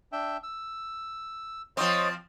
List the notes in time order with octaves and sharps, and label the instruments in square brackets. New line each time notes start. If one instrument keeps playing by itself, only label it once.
[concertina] D4 E5 G5
E6
[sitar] F3 C4 [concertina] C5 C#5 D#5